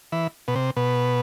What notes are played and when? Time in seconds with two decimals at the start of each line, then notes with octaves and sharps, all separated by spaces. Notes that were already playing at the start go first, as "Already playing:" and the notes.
0.12 E3
0.48 B2
0.55 C3
0.76 B2